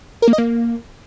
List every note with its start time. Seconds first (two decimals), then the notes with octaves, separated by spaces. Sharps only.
0.22 A#4
0.28 A#3
0.33 D#5
0.38 A#3